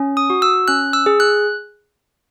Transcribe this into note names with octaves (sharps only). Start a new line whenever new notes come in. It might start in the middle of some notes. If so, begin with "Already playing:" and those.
Already playing: C#4
D#6
F#4
E6
C#4 F#6
E6
G#4
F#6